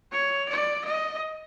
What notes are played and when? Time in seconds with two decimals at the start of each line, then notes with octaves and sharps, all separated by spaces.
0.12 C#5
0.49 D5
0.85 D#5